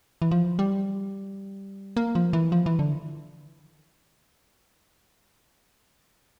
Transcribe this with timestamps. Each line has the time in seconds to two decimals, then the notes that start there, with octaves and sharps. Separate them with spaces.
0.22 E3
0.31 F3
0.59 G3
1.97 A#3
2.15 F3
2.33 E3
2.52 F3
2.66 E3
2.79 D3